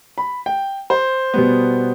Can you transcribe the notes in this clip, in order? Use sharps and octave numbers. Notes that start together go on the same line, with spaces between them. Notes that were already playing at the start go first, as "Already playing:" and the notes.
B5
G5
C5
B2 G3 B3